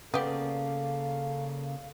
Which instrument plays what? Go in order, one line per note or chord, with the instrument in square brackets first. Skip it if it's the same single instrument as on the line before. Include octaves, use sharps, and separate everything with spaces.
[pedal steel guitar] C#3 A#3 D5 [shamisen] B3 G4 [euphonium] A4 [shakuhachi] F5